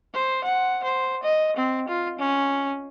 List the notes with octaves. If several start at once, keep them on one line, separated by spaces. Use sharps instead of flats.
C5
F#5
C5
D#5
C4
F4
C#4